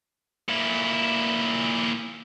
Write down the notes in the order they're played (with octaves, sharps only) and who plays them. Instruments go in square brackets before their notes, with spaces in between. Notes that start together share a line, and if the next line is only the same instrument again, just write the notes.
[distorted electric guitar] A#2 E4